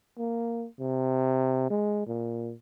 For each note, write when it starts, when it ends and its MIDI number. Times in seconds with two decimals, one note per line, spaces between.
0.18 0.66 58
0.80 1.68 48
1.70 2.06 56
2.07 2.53 46